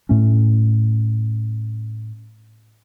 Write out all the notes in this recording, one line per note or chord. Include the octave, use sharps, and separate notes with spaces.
A2 A3 C#4